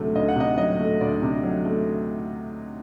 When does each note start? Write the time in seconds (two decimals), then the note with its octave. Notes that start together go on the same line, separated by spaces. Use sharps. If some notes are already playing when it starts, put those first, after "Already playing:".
Already playing: D2 C3 F#3 A3
0.15 D2 D#5
0.28 F#5
0.36 C3 D#5
0.57 F#3 D#5
0.79 A3
1.01 D2 D5
1.22 C3
1.43 F#3
1.65 A3